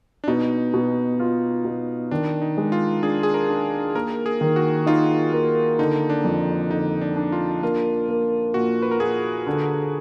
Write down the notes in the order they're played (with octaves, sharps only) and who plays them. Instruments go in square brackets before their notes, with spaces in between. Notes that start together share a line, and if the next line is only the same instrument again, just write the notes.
[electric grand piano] D4
[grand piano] B2 [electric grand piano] D#4
[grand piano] B2
F4
B2
[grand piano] D#3 [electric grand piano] D4
[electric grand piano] D#4
[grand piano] G#3
[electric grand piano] F4
[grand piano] D4 [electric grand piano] G#4
[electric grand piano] G#4
A#4
[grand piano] D4
[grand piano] A#3 [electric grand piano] A#4
[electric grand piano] G#4
[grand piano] D#3
[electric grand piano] F#4
[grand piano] D#4 [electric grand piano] F4
[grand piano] A#3
[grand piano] D3 [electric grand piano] D#4
[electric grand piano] D4
[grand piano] F2
[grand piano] D3 [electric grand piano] D#4
[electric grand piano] D4
[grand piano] D4
[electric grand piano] F4
[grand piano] A#3 [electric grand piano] F4
[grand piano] A#3
[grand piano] A#2 [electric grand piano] F#4
[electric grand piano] B4
A#4
[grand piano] A#2 [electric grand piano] G#4
[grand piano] D3